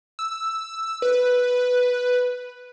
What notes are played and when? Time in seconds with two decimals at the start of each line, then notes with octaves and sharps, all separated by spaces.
0.19 E6
1.02 B4